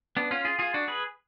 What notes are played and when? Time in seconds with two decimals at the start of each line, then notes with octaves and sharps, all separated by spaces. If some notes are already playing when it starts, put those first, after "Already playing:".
0.17 B3 D4
0.31 C#4 F4
0.45 F4 G#4
0.59 F4 G#4
0.74 D4 F#4
0.88 G#4 B4